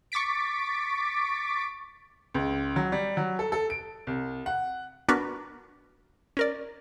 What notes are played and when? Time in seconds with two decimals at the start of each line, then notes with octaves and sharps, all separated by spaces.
0.12 C#6 D6 A6 B6 D7
2.34 C#2
2.76 F#3
2.92 G3
3.17 F#3
3.39 A4
3.52 A4
3.70 D7
4.07 C2
4.46 F#5
5.08 B3 D4 F#4 A#4 B4
6.37 C#4 A#4 D5